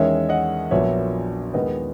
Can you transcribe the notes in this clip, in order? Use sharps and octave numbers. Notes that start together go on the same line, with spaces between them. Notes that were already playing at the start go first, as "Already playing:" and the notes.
Already playing: E2 D#3 G#3 C#4 C#5 E5
D#5 F#5
A#1 A#2 F#3 B3 C#5 E5
D#2 D#3 G#3 B3 B4 D#5